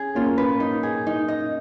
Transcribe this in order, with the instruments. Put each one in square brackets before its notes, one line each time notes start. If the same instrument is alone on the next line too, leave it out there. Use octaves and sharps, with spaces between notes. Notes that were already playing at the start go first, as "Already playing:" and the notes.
Already playing: [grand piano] C#4 [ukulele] G#4
[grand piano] A#3 C#4 [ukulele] F4
[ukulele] B4
D#4
G#4
D#4
D#5